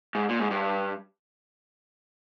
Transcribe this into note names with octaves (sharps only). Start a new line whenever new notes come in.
G#2
A#2
G#2
G2